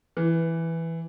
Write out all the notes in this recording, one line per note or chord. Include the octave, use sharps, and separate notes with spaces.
E3